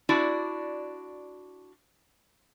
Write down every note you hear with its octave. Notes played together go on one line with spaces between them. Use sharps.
D4 E4 F#4 D5